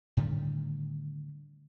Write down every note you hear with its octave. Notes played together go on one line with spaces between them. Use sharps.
A2 D3 D#3 G3